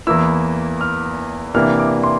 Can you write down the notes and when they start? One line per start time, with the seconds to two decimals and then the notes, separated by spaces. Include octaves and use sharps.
0.07 E2 E3 A#3 E4 E6
0.81 F6
1.54 C3 E3 A#3 D4 F6
1.80 D6
2.04 C6